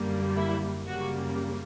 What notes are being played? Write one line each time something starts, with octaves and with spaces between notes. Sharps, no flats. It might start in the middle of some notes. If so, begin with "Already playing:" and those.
Already playing: F#2 D3 G3 A#3
E4
F#2 C#3 G3 A#3 F#4